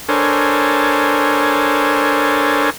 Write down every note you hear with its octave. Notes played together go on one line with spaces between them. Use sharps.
D4 A4 A#4 C5 C#5 G#5